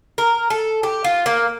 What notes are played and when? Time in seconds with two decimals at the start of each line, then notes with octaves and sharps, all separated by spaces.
0.18 A#4
0.50 A4
0.83 G4
1.04 F4
1.26 A#3